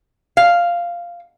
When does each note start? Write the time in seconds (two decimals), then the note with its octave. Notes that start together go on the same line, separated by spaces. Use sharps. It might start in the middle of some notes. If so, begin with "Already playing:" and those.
0.37 F5